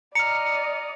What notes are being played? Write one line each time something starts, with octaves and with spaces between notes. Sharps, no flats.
D5 D#5 A#5 F6 C#7